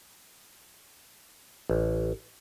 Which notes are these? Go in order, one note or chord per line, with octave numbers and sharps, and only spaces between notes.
A1